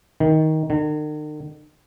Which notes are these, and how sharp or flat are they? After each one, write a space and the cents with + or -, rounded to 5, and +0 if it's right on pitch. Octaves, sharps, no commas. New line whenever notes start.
D#3 +15
D#3 -45